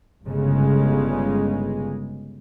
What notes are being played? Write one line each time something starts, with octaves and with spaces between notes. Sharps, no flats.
G1 C#3 G#3